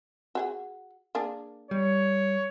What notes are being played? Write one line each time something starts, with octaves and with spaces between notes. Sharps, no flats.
F#4 G#4 F#5
A#3 D4 G#4
G3 C#5